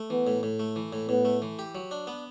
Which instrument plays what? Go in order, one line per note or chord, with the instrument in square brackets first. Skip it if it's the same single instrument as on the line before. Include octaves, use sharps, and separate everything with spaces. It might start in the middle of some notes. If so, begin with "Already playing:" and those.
Already playing: [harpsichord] A3
[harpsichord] E3 [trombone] B3
[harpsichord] A2
A2
A3
E3
A2
[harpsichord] A2 [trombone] B3
[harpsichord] A3
E3
G4
F#3
D4
B3